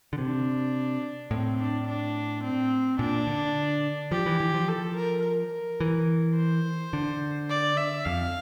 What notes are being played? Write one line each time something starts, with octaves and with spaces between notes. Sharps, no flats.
D3
C3 D4
A2 C4
D4
D4
C4
A#2 D4
D3
F3 G4
E3
E3
F3
A4
A#4
A#4
E3
C5
D3
D5
E5
F2 F5